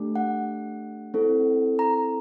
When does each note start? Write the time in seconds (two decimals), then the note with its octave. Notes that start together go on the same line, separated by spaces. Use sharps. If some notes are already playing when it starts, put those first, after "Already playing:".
Already playing: A3 D4 G4
0.16 F#5
1.14 C4 E4 A4
1.79 A#5